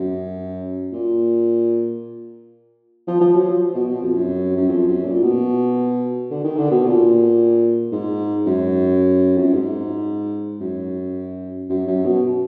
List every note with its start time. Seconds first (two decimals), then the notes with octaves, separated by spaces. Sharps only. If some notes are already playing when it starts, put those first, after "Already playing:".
Already playing: F#2
0.93 A#2
3.08 F3
3.21 F3
3.34 F#3
3.48 F3
3.75 B2
3.88 B2
4.02 F2
4.16 F#2
4.57 F#2
4.69 F2
4.87 F#2
5.05 A#2
5.22 B2
6.31 D3
6.44 D#3
6.57 D3
6.71 B2
6.85 A#2
7.92 G#2
8.46 F#2
9.37 F2
9.45 F#2
9.53 G#2
10.61 F#2
11.69 F#2
11.87 F#2
12.05 B2